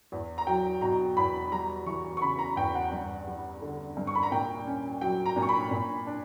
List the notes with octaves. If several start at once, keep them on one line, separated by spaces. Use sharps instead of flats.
E2
A#5
F#3 G5
B2 A#5
E2 B5
G3 A#5
E3 C#6
C#6
C#3 B5
A#5
E2 G5
F#5
G2
G3
D3
G2
C#6
B5
A#5
A#2 G5
C#4
F#3 G5
A#5
A#2
C#6
B5
A#2
D4